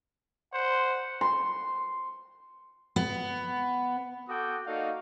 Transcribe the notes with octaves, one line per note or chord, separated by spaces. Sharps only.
C5 F#5
C6
B3
F#4 A4 F#5 G5 D6 D#6
A#3 D#4 F#4 A4 D5 F5